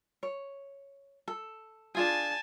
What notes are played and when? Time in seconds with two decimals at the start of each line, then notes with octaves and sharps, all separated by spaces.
0.23 C#5
1.28 A4
1.95 D4 F4 G#4 G#5 A5